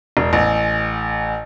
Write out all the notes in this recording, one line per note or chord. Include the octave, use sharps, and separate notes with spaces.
E1
A1